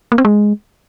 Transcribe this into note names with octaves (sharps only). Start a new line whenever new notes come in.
A#3
C4
G#3